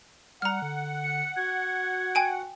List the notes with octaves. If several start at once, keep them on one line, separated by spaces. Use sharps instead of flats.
G3 F#5 A#5 F6
D3
C#7
F#4 G#6
G5 G#5 D7